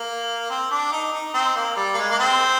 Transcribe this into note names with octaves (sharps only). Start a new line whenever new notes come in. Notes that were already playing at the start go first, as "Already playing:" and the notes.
Already playing: A#3
C4
D4
D#4
D#4
C4
A#3
G3
A#3
G#3
A#3
C4